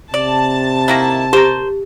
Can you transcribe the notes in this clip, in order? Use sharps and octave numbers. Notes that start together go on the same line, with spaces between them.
C3 D5 A5
D#3 A#3 E4
G4 A#4 C5